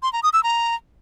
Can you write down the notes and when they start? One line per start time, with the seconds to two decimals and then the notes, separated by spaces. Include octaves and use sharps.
0.03 C6
0.13 A#5
0.23 D#6
0.33 E6
0.43 A#5